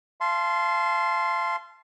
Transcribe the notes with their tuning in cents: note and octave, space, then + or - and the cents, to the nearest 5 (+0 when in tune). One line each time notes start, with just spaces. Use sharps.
F5 -30 A5 -20 C6 +0